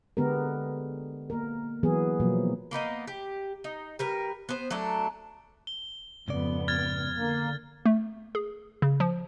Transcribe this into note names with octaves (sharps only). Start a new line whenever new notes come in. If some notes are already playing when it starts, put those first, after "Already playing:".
D3 G#3 B3 G4 A#4
A#3 A#4
E3 F#3 B3 G#4
B2 F3 F#3 A#3
A#3 B3 D#4 D#5
G4
D#4
G3 A#4 B4
B3 C5
F#3 A3 D4 A4
G7
F2 G#2 C#3 B3 D5
F6 G#6 A6
D3 A#3
A3
G#4
C#3
F3